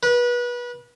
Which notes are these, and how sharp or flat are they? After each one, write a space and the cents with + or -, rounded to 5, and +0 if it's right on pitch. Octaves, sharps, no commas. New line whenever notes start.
B4 -30